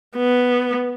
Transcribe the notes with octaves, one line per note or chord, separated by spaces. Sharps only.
B3